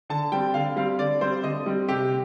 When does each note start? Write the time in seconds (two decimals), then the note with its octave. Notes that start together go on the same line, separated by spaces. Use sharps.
0.09 D3 A5
0.32 G3 C4 G5
0.54 D3 F5
0.76 G3 C4 F5
0.99 D3 D5
1.21 G3 C4 C5
1.44 D3 D#5
1.66 G3 C4
1.89 C3 G4